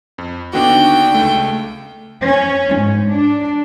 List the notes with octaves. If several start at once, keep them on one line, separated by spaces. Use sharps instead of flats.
F2
D#2 D3 B3 D4 F#4 D5 G5
C#2 A3
C#4
G#2
D4